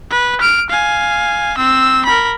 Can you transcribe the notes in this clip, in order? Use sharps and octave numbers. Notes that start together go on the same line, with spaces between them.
B4
F6 D7
F5 G#5
C4 E6
A#4 B5